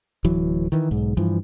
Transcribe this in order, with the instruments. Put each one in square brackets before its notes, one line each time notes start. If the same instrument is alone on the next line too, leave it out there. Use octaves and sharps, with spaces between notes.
[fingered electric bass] D1 E3 F#3
D#3 E3
B1 G#2
G2 E3 F3